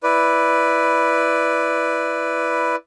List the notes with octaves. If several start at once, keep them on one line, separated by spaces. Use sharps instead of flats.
E4 B4 D5